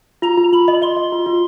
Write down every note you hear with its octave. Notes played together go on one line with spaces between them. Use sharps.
F4 A#5
F4
F4 B5
D#5
D#5 C6
D#5
F4
F4